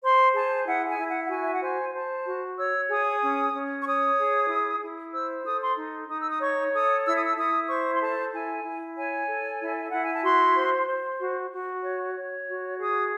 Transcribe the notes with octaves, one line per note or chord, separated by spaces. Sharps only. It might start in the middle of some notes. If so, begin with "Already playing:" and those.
C5 C6
G#4 A5
E4 F#5
G#5
E4
F#5
F#5
F#4 G#5
E5
F#5
C5 G#5
C5 A5
F#4
C#5 E6
G#4 D#6
C#4
C#4
C#6
C#5 D#6
G#4
E4
E4
C5 E6
A4 D#6
C6
D#4
D#4 D#6
E6
D#6
C#5 C#6
A4 D#6
E4 E6
D#6
E6
E4 D#6
C5 C#6
C6
A4 A5
E4 G#5
E4
C#5 G#5
A4
E4
E5
E4 F#5
G#5
A5
F#4 C6
C5
C5
F#4
F#4
C#5
C#5
F#4
G#4 D#6